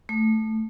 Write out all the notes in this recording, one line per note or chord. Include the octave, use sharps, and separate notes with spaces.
A3